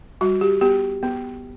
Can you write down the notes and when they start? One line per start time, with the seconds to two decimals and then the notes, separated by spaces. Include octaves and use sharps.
0.21 G3 F#4
0.41 G4
0.61 B3 G4
1.03 B3